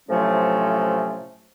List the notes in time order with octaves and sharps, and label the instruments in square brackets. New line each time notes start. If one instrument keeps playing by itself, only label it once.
[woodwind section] A2 C3 F3 F#3 A3 C#4